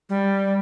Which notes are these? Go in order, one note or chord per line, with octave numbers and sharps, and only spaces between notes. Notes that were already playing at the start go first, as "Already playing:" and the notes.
G3